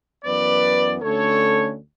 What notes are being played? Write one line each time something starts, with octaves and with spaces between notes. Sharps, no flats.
F#2 E3 B3 B4 D5
D2 D3 A3 C#4 A4 C#5